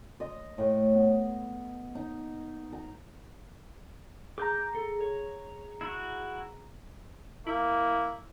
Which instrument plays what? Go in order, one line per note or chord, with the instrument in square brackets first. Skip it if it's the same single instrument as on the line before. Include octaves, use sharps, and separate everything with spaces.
[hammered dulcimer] D#5
A2
B3
D#4
A#5
[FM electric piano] G#4 A#5 [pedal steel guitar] D6 G6
[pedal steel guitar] A4
C#5
E4 F#4
[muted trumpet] A#3 [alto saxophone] E4